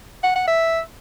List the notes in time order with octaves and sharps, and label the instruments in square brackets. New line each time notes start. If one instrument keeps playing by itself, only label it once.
[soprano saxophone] F#5
F#5
E5